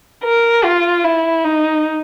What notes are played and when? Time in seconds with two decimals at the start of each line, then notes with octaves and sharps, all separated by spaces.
0.24 A#4
0.64 F4
1.04 E4
1.44 D#4